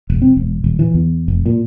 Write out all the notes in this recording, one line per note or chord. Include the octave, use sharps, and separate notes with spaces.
E1
C4
E1
D#1
E3
E2
F1
A#2